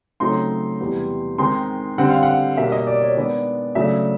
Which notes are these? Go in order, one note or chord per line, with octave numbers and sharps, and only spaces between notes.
C#3 F#3 A3 C4 D#4 C6
E2 C3 E3 G3 B3
D#3 G#3 C4 D#4 C6
D3 G3 C4 F#5
F5
F#5
B2 G3 A#3 E5
D#5
D5
C#5
D#3 G#3 B3 D4 D5
C#3 F#3 A3 D4 E5